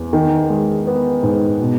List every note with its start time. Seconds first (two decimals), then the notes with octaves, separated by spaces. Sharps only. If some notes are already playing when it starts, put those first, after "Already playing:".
Already playing: E2
0.13 D#3
0.49 G#3
0.87 B3
1.23 G#2
1.60 B2